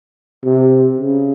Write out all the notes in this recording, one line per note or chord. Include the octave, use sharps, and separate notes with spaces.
C3
C#3